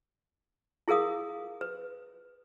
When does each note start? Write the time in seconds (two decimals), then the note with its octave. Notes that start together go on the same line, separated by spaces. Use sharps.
0.88 E4 G#4 A#4 F5 D#6
1.61 B4